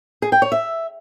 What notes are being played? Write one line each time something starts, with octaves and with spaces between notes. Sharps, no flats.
G#4
G5
C#5
E5